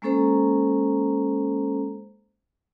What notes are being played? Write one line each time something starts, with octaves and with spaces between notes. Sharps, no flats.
G#3 A#3 C#4 A4 C5 A#5